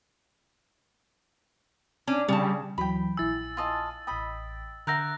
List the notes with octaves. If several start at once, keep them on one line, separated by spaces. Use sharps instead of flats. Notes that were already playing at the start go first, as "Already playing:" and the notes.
C#4 D4
C#3 G3 A5
D2 E3 F#3 G5 B5
A#1 E4 G#5 E6 A6
F4 D#5 A5
A1 D#5 G5 B5
D3 A#4 E5 F#5 F#6 G6 A#6